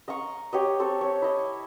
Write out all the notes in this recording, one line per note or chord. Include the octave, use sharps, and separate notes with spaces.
D#5 F5 A#5 C#6
G4 C#5 D#5
C4 A4 C#5
C#5
E4 D#5